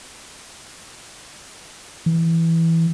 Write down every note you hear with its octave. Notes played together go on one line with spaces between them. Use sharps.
E3